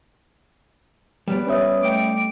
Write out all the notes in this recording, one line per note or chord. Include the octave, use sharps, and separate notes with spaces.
G3 B3 D5
C#4 B4 C#5 E5 D#6
A3 G5 D6